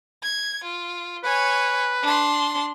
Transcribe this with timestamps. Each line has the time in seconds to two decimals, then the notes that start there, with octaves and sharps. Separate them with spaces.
0.23 G#6
0.64 F4
1.24 B4 C#5 G#5
2.03 D4 C6